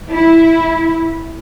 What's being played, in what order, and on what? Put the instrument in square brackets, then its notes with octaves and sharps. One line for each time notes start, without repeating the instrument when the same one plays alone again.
[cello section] E4